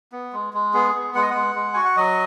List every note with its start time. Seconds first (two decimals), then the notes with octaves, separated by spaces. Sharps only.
0.12 B3
0.33 G#3
0.54 G#3
0.74 B3 G#4
0.95 B3
1.15 G#3 F#5
1.22 D#5
1.30 G#3 F#5
1.55 G#3
1.74 F#4 G#5
1.85 F#5
1.96 F#3 D#5